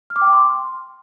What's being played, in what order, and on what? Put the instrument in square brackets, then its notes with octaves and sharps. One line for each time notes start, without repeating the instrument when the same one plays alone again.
[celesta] F6
D6
G5
D6
C6